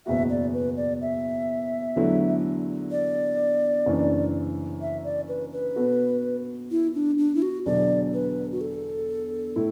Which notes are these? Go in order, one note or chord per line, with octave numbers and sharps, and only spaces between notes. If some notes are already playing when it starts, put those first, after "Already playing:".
F#1 E2 B2 B3 F#4 E5
D5
B4
D5
E5
E2 D3 F#3 A3 E4
D5
F#1 F#2 E3 D4
E5
D5
B4
B4
B2 B3 F#4 A4
E4
D4
D4
E4
F#4
E1 E2 D3 F#3 D4 D5
B4
F#4
A4
A2 A3 E4